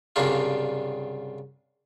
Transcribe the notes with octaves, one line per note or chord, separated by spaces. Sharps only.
C2 G2 C#3 F#3 D4 F4